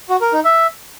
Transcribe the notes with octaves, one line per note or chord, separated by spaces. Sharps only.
F#4
A#4
D#4
E5